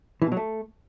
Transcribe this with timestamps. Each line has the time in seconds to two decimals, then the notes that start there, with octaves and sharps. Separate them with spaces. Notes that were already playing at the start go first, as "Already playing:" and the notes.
0.22 E3
0.27 B2
0.32 F#3
0.37 A3